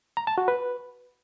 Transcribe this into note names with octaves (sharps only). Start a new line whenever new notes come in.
A#5
A5
F#4
B4